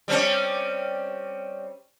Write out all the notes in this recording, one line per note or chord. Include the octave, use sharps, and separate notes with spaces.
G3 C4 C#4